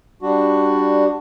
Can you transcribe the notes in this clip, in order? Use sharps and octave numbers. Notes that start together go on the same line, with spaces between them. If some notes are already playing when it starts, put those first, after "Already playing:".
G3 D4 F#4